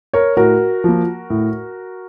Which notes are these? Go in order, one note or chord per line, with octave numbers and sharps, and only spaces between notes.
A#4 C#5
A2 F#4 A#4
F3 A#3
A2